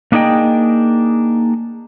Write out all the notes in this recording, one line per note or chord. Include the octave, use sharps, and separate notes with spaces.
A#3 D4 D#4 G#4 D#5 G5